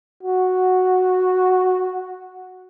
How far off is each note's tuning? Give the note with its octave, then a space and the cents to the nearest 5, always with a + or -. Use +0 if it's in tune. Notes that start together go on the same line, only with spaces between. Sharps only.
F#4 -5